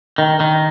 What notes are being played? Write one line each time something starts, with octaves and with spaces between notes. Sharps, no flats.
D#3
D#3